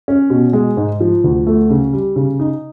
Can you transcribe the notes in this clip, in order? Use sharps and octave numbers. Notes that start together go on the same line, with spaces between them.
C#4
B2
G#3
G#2
F3
D2
A3
C#3
G3
C#3
D#4